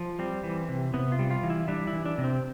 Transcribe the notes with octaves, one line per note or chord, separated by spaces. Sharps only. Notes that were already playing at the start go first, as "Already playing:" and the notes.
Already playing: F3
G3 C4
E3
C3
C3 B3
F4
G3
F4
E3
E4
G3 D4
E4
E3
D4
C3
C4